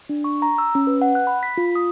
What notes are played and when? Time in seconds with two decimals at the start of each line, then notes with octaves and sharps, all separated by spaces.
0.09 D4
0.24 C#6
0.42 A#5
0.58 E6
0.75 C#4
0.87 B4
1.02 F#5
1.15 F#6
1.27 B5
1.43 B6
1.57 F4
1.75 D#6